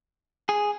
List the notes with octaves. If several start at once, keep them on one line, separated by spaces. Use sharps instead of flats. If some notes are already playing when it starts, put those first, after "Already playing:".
G#4